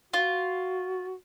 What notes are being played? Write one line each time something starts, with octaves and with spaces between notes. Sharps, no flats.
F4 F#4